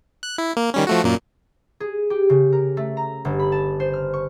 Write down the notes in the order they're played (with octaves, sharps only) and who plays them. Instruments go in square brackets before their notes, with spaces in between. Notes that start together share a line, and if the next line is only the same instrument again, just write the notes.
[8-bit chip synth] F#6
E4
A#3
D#3 G3 C#4
F3 A3 F#4
F#2 A#2 A#3
[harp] G#4
G4
C#3
A#4
A3
A#5
G1
B5
A5
C5
F6
C#6